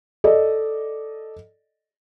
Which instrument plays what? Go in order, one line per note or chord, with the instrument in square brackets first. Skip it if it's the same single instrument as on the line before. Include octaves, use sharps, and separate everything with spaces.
[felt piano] A4 D5 D#5